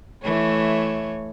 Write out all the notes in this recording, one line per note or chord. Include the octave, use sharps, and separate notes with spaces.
E3 A3 C#5